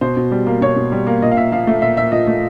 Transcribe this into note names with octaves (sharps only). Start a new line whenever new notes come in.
B2 C5
B2
G3
A#3
B2 C#5
B2
G3
A#3
A#2 D#5
F5
A#2 E5
F3 F5
A3
A#2 E5
A#2 E5
F3 D#5
A3